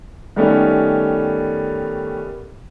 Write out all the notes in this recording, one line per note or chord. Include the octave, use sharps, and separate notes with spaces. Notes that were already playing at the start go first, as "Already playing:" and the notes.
D#3 G3 A3 B3 C#4